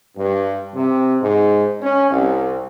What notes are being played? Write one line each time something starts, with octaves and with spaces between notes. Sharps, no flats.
G2
C3
G#2
C#4
C2